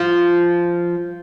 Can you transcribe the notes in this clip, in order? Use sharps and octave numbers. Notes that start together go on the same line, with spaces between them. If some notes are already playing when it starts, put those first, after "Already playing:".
Already playing: F3